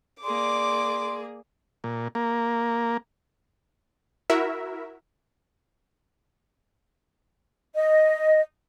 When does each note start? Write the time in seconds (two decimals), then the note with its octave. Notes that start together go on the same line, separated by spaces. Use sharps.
0.24 A#3 G#4 D5 C6 D6
1.84 A#2
2.15 A#3
4.30 E4 F#4 A#4 E5
7.75 D#5